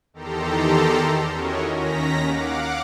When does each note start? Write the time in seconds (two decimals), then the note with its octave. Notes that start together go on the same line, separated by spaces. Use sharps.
0.13 E2 D#3 G4 A4 A#5 C6
1.30 C#4 E4 F#4 A#4 C#5 D#5
1.72 D#2 D#3 C#4 A#5 A#6 B6
2.23 F5 F#5 D6